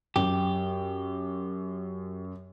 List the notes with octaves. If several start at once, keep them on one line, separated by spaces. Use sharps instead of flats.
F#2 G4